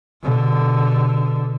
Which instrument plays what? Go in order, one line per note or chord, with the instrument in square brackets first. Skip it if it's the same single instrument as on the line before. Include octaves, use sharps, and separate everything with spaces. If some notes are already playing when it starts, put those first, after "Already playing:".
[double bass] B2 D3